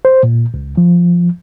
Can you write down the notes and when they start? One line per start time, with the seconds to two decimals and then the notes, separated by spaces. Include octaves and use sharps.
0.05 C5
0.23 A#2
0.54 C#2
0.77 F3